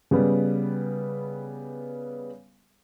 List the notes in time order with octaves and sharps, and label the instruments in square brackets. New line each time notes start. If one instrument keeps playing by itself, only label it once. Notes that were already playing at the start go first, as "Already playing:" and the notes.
[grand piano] C#3 G3 B3